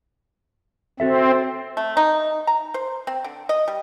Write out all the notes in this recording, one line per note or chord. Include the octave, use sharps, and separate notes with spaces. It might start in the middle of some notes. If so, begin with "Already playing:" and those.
C4 F#4 A4 E5
A3
D#4
A#5
C5
C4
D3
D#5
G3